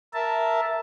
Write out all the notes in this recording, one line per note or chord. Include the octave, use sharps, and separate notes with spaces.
A#4 E5 A5